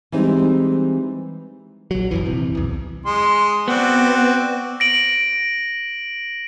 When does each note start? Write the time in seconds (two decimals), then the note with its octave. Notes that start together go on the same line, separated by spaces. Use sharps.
0.12 E3 G3 G#3 C4 D#4
1.91 A#1 F#3
2.11 G1 F#2 E3
2.26 D#1 C3 E3
2.55 B1 E2
3.06 G#3 C6
3.68 B3 C4 F#4 D5
4.80 A#6 D7 F#7